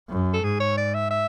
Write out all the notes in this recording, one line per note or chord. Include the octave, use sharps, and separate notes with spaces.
F#2
A4
G#2 G#4
C#5
D5
E5
E5